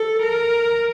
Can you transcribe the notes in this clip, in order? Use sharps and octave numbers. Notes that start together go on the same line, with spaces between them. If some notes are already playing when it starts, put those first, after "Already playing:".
Already playing: A4
A#4